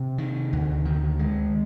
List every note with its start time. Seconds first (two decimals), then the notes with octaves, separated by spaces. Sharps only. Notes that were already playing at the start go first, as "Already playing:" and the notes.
Already playing: C3
0.18 D#3
0.53 D2
0.85 D#3
1.19 G#3